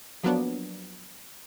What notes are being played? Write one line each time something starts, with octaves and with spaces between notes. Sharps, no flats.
F3 F#3 A#3 B3 D4